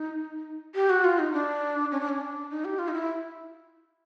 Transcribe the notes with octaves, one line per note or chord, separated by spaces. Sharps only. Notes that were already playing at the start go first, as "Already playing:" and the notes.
Already playing: D#4
G4
F#4
F4
D#4
D4
C#4
D4
C#4
D4
D#4
G4
F4
D#4
E4